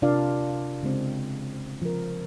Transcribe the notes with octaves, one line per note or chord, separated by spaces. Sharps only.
C3 D4 F4 A#4 D5 F5
C#3 G#3 C4
F3 A#4